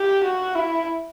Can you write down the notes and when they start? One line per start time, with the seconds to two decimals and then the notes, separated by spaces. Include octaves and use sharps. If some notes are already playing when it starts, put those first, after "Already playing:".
Already playing: G4
0.25 F#4
0.56 E4